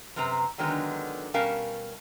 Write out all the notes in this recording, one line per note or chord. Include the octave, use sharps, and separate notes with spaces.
F#2 C3 C4 B4 A#5
D3 D#3 F#3 G#3 B3 D#4
B2 G3 C#4 A#4 F5 A5